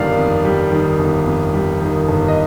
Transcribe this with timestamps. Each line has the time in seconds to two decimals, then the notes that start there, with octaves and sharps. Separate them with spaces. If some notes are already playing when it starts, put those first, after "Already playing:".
Already playing: G1 D#3 G3 D5 F5
0.18 F2
0.45 G3
0.72 D#3
0.99 G1
1.27 F2
1.54 G3
1.81 D#3
2.08 G1
2.28 D#5